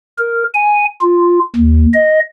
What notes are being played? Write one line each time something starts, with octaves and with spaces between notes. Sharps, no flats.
A#4
G#5
F4
D#2
D#5